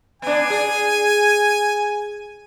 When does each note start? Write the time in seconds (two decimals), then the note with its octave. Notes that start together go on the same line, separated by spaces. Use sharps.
0.22 B3 D4 G#5
0.50 G#4